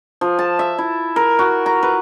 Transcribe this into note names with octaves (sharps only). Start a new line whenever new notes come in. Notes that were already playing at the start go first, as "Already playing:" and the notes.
F3
A5
E5
E4
A#4
F#4
A#5
B4